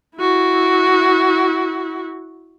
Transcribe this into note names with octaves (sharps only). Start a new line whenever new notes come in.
E4 F#4